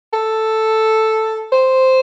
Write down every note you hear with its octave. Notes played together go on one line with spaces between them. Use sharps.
A4
C5